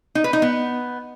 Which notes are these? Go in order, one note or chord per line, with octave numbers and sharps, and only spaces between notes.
D#4
B4
D#4
B3